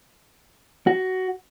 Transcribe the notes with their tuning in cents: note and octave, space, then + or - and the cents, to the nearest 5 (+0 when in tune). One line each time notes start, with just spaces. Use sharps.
F#4 +15